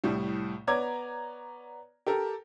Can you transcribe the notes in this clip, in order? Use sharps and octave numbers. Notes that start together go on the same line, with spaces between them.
C2 A2 G3
B3 C#5 D5 A#5 D6 G#6
G4 A4 A#4